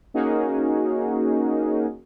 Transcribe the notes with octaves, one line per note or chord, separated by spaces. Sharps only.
A#3 C#4 D#4 F#4 G#4 A#4